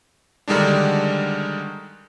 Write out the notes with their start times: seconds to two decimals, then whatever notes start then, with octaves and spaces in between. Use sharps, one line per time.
0.48 D3 D#3 G3 G#3 D4